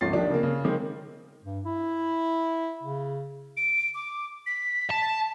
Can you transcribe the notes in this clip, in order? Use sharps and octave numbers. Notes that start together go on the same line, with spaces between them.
G#1 D2 F3 C#4 A6 C7
D#3 F3 D4 G4
C#3 A#3
C#3
D#3 G#3 C4
G2
E4
C#3
D7
D6
B6
A5